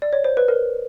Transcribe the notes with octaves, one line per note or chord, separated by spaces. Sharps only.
D5
C#5
C5
B4
A#4